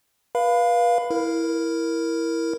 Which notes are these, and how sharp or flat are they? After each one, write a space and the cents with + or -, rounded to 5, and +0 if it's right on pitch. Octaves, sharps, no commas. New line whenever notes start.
B4 -35 F5 +0 B5 +15
E4 +0 A#4 +0